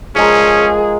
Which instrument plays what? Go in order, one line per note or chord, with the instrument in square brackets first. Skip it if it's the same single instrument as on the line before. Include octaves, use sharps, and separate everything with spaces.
[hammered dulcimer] F3 G#3 A#4 [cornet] C#4 [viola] G#4